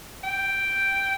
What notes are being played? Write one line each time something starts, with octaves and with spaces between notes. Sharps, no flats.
G5